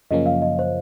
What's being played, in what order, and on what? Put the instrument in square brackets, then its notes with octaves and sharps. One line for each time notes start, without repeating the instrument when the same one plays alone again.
[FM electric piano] F#2 C#3 F3 A#3 C#4 [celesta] D#5
[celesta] F5
D#5
C5